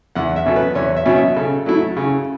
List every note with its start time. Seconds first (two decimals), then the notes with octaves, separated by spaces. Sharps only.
0.15 E2 F#5
0.36 E5
0.46 B2 F#3 C#4 A4
0.56 B4
0.75 E2 C#5
0.97 E5
1.05 B2 F#3 C#4
1.16 E5
1.36 C#3 A4
1.66 F#3 A3 E4
1.97 C#3